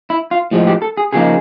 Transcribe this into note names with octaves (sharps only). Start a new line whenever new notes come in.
E4
F4
A2 F3 G#3
G4
A4
G#4
C#3 F3 A#3 D#4 G#4